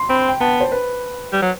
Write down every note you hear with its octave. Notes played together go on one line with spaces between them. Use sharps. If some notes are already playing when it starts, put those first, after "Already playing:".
Already playing: C6
C4 B5
G5
B3 A5
C5
B4
G3
F#3